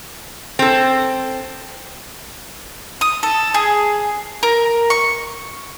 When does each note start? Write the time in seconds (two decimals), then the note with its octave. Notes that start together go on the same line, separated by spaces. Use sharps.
0.59 C4 A4
3.01 D#6
3.23 A4
3.54 G#4
4.43 A#4
4.90 C#6